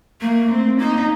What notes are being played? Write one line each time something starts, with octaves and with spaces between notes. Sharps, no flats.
A3 A#3
C4
A#3 D#4